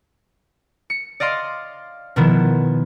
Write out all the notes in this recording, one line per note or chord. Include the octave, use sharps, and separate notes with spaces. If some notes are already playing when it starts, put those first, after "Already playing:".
C#7
D5 D#5 F5 C6
B2 D#3 F3 B3 E4